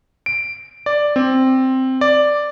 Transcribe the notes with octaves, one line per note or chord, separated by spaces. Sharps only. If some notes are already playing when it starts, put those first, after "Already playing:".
D7
D5
C4
D5